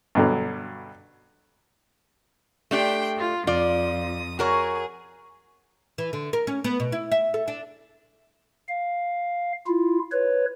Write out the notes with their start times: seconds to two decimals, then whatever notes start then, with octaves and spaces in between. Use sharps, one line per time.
0.15 G2 B2 D3 F#3
2.71 A3 D4 G4 G5 C6
3.17 F4
3.47 F2 F4 D5 D#6
4.39 F#4 G#4 A#4 C#5
5.98 E3
6.13 D3
6.33 A#4
6.47 C#4
6.64 B3
6.80 B2
6.92 E4
7.12 E5
7.34 A4
7.48 D4
8.69 F5
9.67 E4 F4
10.12 B4 C#5